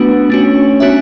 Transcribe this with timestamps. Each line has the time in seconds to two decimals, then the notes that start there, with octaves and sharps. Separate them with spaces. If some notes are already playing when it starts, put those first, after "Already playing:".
Already playing: A3 B3 D4 F#4
0.30 A3 C#4 D4 F#4
0.80 B3 D4 F#4 C#5 E5